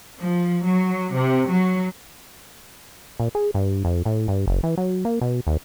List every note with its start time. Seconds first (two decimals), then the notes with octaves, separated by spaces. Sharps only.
0.20 F3
0.66 F#3
1.16 C3
1.49 F#3
3.20 A#2
3.35 G#4
3.54 G2
3.85 F2
4.06 A2
4.28 G2
4.47 F#1
4.63 E3
4.77 F#3
5.05 A#3
5.21 B2
5.47 D#2